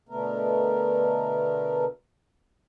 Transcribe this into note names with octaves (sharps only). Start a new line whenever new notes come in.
B2 D3 A3 B3 A#4